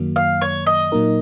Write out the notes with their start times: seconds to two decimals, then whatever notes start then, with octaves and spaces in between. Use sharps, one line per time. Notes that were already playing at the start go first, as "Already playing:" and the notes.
Already playing: F#2 D#3 F#3 A#3
0.16 F5
0.41 C#5
0.67 D#5
0.92 A#2 F#3 A#3 D#4 A#4